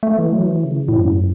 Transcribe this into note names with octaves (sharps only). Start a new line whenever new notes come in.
A3
E3
F#3
E3
C#3
A2
F#2